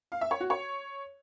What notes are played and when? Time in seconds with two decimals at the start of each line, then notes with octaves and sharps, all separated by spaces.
0.12 F5
0.21 E5
0.31 C#5
0.40 F#4
0.50 C#5